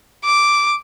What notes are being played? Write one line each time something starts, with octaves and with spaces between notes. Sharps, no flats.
D6